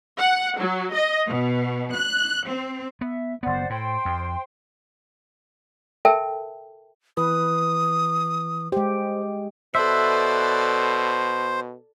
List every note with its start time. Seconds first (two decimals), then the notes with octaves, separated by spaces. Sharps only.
0.18 F#5
0.59 F#3
0.93 D#5
1.28 B2
1.95 F#6
2.48 C4
3.01 B3 E5
3.43 F#1 B3 C5 D5 F#5
3.70 A2 C5 G5 C6
4.05 F2
6.05 A4 A#4 E5 G5 A5
7.17 E3 B4 D#6
8.72 G#3 G4 C5
9.75 B2 A4 B4 C5 D5 E5